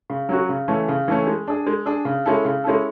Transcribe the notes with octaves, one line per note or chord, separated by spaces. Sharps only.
C#3
F#3 C#4 F#4
C#3
E3 A3 C#4
C#3
E3 A3 C#4
G#3
D4 G#4
G#3
D4 G#4
C#3
G#3 C#4 E4 A4
C#3
G#3 C#4 E4 A4